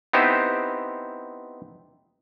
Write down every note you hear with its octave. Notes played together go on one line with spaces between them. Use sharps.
B3 C4 D#4 E4 G4 C5